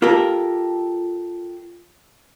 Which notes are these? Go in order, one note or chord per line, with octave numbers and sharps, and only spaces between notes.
F4 G4 A4 A#4